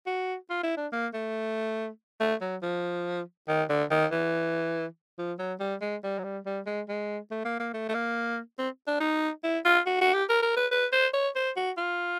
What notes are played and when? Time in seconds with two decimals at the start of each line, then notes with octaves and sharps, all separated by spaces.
0.06 F#4
0.50 F4
0.63 E4
0.77 D4
0.92 A#3
1.14 A3
2.20 A3
2.41 F#3
2.62 F3
3.48 D#3
3.69 D3
3.91 D#3
4.12 E3
5.18 F3
5.39 F#3
5.60 G3
5.81 G#3
6.03 G3
6.19 F#3
6.24 G3
6.46 G3
6.66 G#3
6.89 G#3
7.31 A3
7.45 A#3
7.60 A#3
7.74 A3
7.89 A3
7.94 A#3
8.59 C4
8.87 D4
9.00 D#4
9.44 E4
9.65 F4
9.86 F#4
10.01 F#4
10.14 G4
10.29 A#4
10.42 A#4
10.57 B4
10.71 B4
10.92 C5
11.13 C#5
11.36 C5
11.56 F#4
11.77 F4